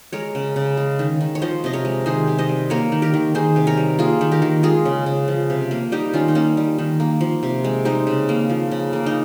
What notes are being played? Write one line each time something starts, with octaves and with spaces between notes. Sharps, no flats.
G#3 A#4 C#5
C#3
C#3
G#3
D#3
D#3
C#5
F3 C5 D#5
C3 D#5
A#4 C#5
G#3
D#3 G#4 C5
C3
C5 D#5
G3
A#3 A#4 C#5
D#3
G4 A#4
D#3
D#3 G#4 C5
C3
A#4 C#5
G3
A#3 F4 G#4
D#3
G4 A#4
D#3
G#3 F4 G#4
C#3
C#3
F3
C3
A#3
G3 D#4 G4
D#3 C#4 F4
D#4
A#3 C#4
G3
D#3
A#3
F3
C3
G#3
G3 C4 D#4
C#3
A#3
F3
C#3
A#3
D#4